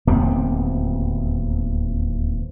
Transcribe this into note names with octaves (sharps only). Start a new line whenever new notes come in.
D1 D#2 B3 C4